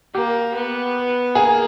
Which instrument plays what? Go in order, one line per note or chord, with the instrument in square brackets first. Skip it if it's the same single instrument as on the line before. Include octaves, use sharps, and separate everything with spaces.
[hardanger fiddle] A#3 [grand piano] G4
[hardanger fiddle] B3
[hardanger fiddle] A#3 [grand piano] G#4